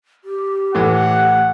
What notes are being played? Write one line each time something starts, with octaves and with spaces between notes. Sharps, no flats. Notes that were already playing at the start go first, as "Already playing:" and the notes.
G4
A2 E3 F#5